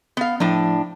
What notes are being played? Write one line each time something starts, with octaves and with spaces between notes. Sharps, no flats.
B3 F5
A2 F3 D4